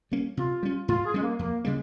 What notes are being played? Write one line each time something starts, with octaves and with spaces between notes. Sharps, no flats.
G3 A#3 C#4
C3 F4
G3 C#4
G#2 F4
G#4
G3 G#3 C#4
A#3
F2 A#3
C#3 G3 G#3 A#3